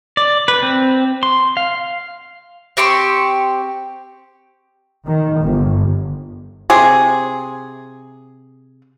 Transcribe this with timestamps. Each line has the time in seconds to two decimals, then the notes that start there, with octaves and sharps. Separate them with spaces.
0.17 D5
0.48 B4
0.63 C4
1.23 C6
1.57 F5
2.77 C4 G4 C6 C#6
5.06 D#3
5.41 G1
6.70 C3 G#4